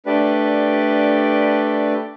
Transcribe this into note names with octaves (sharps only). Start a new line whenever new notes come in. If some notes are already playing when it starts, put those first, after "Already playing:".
A3 D4 G4 B4 D5